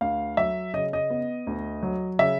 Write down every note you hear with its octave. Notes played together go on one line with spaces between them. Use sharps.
D2 F5
F#3 E5
C#3 D#5
D#5
B3
D2
F#3
C#3 E5